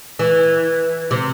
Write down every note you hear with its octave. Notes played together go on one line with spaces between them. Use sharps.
E3
C3